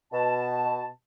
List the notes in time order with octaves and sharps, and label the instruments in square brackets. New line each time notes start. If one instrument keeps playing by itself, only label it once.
[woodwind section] B2 A5